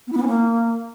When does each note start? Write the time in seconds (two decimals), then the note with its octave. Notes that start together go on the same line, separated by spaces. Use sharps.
0.07 B3
0.12 E4
0.17 B3
0.22 C#4
0.27 A#3